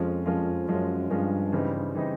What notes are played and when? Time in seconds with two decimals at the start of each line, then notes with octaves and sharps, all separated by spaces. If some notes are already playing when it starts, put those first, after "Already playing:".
Already playing: F2 F3 G#3 C#4 F4
0.26 F3 G#3 C#4 F4
0.68 F#2 F3 G#3 C#4 F4
1.10 G2 F3 G#3 C#4 F4
1.52 C#3 E3 G3 C4 D#4
1.94 C#3 E3 G3 C4 D#4